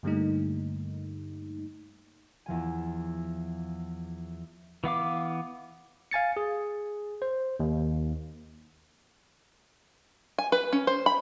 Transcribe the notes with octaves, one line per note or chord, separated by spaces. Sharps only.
G2 D3 G3 A3 A#3 D#4
E2 F3 G#5
E3 B3 F5 D6
F5 G#5 A6 C#7
G#4
C5
D#2
G#5
B4
C#4
C5
B5